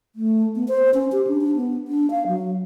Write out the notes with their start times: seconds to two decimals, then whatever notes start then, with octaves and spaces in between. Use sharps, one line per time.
0.16 A3
0.55 B3
0.68 C5
0.94 C#4
1.12 G4
1.27 D4
1.41 D4
1.56 B3
1.88 D4
2.11 F5
2.27 F#3